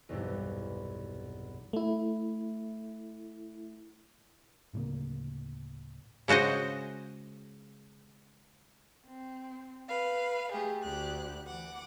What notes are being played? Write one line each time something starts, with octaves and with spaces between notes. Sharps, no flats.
B1 E2 G2 C3
A3 E4
D1 A2 C#3 A#3
C#3 G#3 F#4 C5 D#5
C4
B4 F5
A3 G4 G#4
D2 G4 F#6
E3 F#5 D6